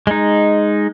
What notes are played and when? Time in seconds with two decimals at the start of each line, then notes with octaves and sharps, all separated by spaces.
0.07 G#3 D#4